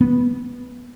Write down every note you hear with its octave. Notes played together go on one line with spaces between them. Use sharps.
B3